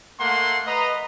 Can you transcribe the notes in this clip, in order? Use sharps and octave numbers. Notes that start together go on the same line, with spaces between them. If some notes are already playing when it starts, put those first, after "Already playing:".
A3 A#3 F#5 C6
B4 D#5 A#5